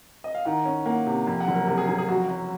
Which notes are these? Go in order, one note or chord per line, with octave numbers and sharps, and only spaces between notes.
D#5
F5
D#3 F#5
C#4
A#3 F#5
C3
F2
F#5
F#1
A#4
C3 A#4
G#4
F#1 G#4
G#4
F2 F#4
F#3